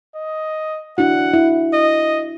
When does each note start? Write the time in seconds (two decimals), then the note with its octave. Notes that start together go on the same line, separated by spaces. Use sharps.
0.15 D#5
0.98 D4 E4 F#4 F#5
1.33 E4
1.73 D#5